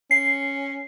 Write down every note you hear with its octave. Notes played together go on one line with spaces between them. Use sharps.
C#4 C7